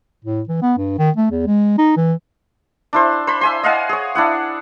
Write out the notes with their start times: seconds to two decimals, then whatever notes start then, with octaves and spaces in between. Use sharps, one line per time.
0.24 A2
0.49 E3
0.62 B3
0.77 G2
0.98 D#3
1.16 A3
1.31 E2
1.46 G#3
1.78 D#4
1.96 E3
2.93 D4 E4 C5
3.27 C5 B5
3.41 E5 G#5 C6
3.63 D#5 F5 F#5 G#5
3.89 G#4 C#5
4.15 D4 E4 F#5